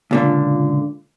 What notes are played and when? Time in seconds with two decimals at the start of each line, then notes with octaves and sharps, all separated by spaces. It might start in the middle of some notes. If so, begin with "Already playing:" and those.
0.11 C#2 A#2 D3